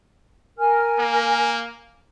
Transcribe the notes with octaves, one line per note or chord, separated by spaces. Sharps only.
A#4 G#5 F6
A#3